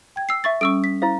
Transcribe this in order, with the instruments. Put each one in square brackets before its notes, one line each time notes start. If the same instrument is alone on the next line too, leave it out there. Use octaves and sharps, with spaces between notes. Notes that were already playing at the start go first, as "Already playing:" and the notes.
[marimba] G5 G#6
[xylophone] E6 C7
E5 C#6 A6
[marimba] G3 C#4 [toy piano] A4 [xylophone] C#6 E6 D7
[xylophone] B6
[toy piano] E4 C5 F5